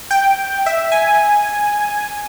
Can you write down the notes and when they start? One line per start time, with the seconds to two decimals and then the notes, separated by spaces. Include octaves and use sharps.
0.11 G5
0.66 E5
0.92 G#5